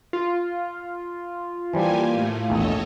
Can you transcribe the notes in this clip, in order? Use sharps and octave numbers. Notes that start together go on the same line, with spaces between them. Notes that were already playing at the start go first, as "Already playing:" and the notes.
F4
E3 F3 G3 A#3 G4 G#5
A2 A3
A#1 E2 A4 C#5 D#5